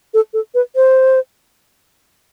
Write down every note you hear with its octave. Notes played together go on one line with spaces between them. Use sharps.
A4
A4
B4
C5